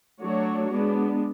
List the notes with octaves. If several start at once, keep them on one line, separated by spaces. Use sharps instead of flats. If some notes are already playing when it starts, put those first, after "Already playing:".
F#3 A3 D4 F#4 C#5
G#3 B3 D4